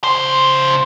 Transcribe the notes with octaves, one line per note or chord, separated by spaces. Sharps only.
C#3 C5